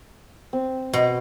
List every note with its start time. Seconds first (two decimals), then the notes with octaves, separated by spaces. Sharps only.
0.53 C4
0.94 B2